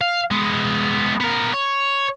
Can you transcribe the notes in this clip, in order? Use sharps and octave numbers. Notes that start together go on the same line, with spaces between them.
F5
G#3 B3
B3 A#4
C#5